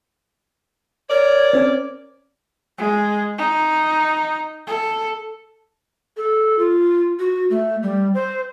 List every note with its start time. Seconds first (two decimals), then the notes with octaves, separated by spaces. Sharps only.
1.09 A#4 C#5 D5
1.53 C4 C#4
2.78 G#3
3.38 D#4
4.67 A4
6.17 A4
6.59 F4
7.19 F#4
7.50 A3
7.83 G3
8.14 C5